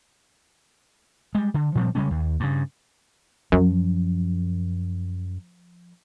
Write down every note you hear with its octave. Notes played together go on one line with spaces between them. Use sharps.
G3 G#3
D3
A#2 F3 G3 C4
C#3 G3 G#3 C#4
D#2
G2 C#3
F#2 F3